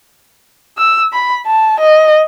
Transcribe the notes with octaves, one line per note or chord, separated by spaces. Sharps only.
E6
B5
A5
D#5